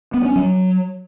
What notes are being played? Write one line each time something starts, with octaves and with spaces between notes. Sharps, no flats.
B3
C#4
F#3